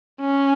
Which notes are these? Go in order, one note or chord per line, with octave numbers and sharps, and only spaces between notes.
C#4